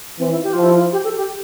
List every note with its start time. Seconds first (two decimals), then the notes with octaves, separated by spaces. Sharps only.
0.19 E3 C4
0.31 E4
0.43 G4
0.53 F3 F4
0.63 E4
0.73 F4
0.92 G4
1.04 A4
1.17 G4